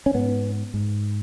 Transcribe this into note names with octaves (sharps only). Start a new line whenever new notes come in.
C#4
G#2 B3
G#2